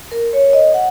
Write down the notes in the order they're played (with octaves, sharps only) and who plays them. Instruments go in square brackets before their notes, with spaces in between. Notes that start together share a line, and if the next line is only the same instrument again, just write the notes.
[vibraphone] A#4
C#5
D#5
F#5